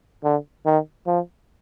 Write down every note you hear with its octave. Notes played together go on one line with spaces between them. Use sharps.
D3
D#3
F3